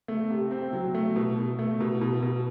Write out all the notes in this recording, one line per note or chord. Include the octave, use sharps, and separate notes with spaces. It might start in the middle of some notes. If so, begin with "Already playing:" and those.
A3
C3
C4
F#3
A3
B2
B2
A3
B2
B2
B2